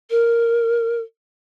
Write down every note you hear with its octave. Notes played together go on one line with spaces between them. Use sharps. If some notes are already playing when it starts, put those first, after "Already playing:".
A#4